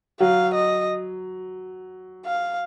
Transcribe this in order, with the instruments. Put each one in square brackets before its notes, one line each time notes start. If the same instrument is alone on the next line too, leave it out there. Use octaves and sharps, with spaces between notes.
[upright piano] F#3 [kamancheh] F5
[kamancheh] D#5
F5